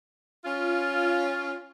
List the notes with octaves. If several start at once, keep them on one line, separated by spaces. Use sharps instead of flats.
C#4 F4